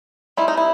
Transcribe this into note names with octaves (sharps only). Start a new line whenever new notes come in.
G3 C4 D#4 E4
D#4
E4